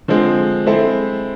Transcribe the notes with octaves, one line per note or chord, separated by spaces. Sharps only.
D3 F3 G#3 C4
G#3 C4 E4 A4